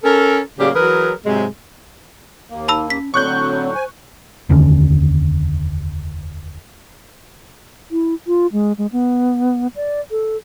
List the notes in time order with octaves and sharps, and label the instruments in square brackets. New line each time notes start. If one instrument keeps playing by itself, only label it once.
[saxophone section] C#4 A4 A#4
A2 C#3 F#3 A#3 G4 D5
E3 F#3 G#4 A#4 B4
G#2 C3 F#3 G#3
[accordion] D#2 A#3
[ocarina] D#4 [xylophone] A5 B5 E6
[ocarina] C#4 [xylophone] B6
[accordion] A2 D3 F#3 [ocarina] C4 [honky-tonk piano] C#6 F#6 G6
[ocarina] C5 [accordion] G#5
[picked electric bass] F1 D#2 D3 C#4
[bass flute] E4
F4
G#3
G#3
B3
D5
A4